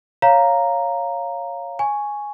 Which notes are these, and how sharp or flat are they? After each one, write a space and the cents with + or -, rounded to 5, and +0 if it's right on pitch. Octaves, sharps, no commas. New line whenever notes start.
C#5 +0 F5 +0 A#5 +0
G#5 +0 C#6 +0